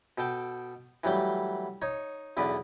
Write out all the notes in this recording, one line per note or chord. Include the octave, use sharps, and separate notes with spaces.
B2 A4 G5 A5
E3 F#3 G3 A3
D#4 C#5 C#6
B1 E2 B3 B4 D5